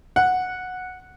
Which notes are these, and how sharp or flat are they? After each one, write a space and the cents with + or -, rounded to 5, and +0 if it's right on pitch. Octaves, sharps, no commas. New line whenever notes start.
F#5 -10